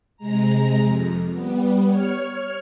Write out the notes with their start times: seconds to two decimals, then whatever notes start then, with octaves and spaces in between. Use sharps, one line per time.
0.17 C3 G#3 A#5
0.82 F2
1.31 G3 B3
1.87 C#5 F6